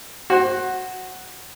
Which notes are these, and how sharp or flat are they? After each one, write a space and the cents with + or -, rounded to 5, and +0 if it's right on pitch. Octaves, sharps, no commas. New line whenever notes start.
F#4 +0 C5 +30